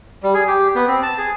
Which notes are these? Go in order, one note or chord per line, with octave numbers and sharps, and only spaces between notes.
G3
G#4
G4
B3
C4
A5
G#4